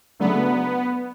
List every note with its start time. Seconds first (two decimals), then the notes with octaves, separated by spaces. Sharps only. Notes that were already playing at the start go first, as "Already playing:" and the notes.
0.19 C#3 F#3 A3 B3 D4